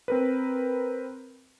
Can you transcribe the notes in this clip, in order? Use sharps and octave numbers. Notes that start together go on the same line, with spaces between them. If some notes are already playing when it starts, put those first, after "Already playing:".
C4 A#4 B4